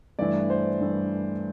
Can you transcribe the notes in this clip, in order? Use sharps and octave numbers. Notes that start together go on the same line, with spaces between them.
G2 E3 A3 D5
C5
G2 E3 A3